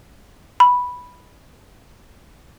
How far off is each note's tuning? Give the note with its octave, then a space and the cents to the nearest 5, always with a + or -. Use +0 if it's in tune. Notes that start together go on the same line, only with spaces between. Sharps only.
B5 -5